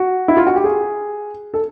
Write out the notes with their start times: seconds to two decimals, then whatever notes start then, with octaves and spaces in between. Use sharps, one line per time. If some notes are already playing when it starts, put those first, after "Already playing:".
Already playing: F#4
0.28 E4
0.37 F4
0.47 F#4
0.55 G4
0.64 G#4
1.54 A4